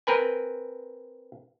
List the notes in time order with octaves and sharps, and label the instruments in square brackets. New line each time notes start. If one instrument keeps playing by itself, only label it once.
[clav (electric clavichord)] C4 A#4 B4 G#5